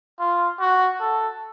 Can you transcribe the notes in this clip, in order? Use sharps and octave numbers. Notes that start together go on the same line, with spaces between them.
F4
F#4
A4